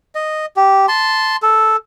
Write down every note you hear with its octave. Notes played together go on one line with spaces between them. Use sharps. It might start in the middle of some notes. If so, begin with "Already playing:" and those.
D#5
G4
A5 C6
A4